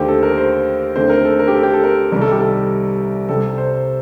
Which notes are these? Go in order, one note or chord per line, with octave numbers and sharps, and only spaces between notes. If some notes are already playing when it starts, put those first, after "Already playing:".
Already playing: D#2 D3 A3 G4 C5
A4
A#4
C5
D#2 D3 A3 C4 C5
A#4
A4
A#4
G4
A4
G4
A4
A#4
C2 C3 D#3 G3 A#4
A4
G4
A4
C2 C3 G3 C4 A4
C5